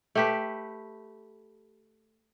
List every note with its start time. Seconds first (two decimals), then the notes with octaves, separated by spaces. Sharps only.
0.15 A3 G4 B4